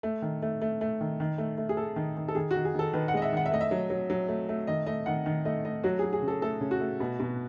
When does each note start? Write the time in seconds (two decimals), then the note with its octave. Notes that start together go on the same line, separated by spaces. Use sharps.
0.03 A3
0.22 D#3
0.42 A3
0.62 A3
0.81 A3
1.01 D#3
1.20 D#3
1.38 A3
1.58 A3
1.69 G#4
1.77 A3 A4
1.96 D#3
2.17 D#3
2.28 A4
2.35 D#3 G#4
2.51 D#3 F#4
2.65 G#4
2.74 D#3 A4
2.93 D#3 B4
3.08 F#5
3.14 G#3 D#5
3.22 E5
3.33 D#3 F#5
3.46 E5
3.51 A3 D#5
3.61 E5
3.71 F#3
3.90 F#3
4.10 F#3
4.28 A3
4.49 A3
4.67 D#3 D#5
4.86 A3 D#5
5.06 D#3 F#5
5.26 D#3
5.45 A3 D#5
5.64 A3 D#5
5.84 F#3 F#4
5.99 F#3 G#4
6.13 G#4
6.22 C#3
6.28 A4
6.42 A3 A4
6.61 C#3
6.71 F#4
6.81 A3
7.00 B2
7.20 B2